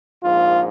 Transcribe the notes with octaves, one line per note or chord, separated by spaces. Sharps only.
A#1 G#2 F3 F4